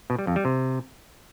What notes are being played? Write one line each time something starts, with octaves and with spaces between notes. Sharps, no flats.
B2
G3
F2
G3
C3